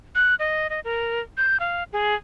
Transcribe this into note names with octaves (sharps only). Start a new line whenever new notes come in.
F#6
D#5
D#5
A#4
G6
F5
G#4